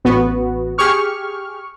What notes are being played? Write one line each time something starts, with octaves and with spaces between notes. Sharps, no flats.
A1 B3 F#4
G4 G#4 C#6 F6